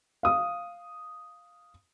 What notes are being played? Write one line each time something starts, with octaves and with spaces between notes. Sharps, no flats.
F5 D#6